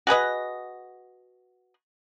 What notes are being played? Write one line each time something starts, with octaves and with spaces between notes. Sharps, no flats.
F#4 G#4 B4 D#5